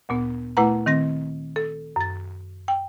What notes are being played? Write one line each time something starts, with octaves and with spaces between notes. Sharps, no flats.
D2 A#2 B3
A#2 A3 E4 B4 F#5 A#5
D#3 C4 A#6
A4
F#2 A6
G5